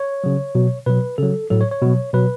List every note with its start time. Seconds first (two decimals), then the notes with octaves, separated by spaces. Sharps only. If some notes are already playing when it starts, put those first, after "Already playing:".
Already playing: C#5
0.24 C#3 F#3
0.55 B2 F#3
0.86 B2 F#3 B4
1.18 C#3 F#3 A4
1.50 A2 F#3 A4
1.61 C#5
1.71 C#5
1.81 B2 F#3
2.13 B2 F#3 B4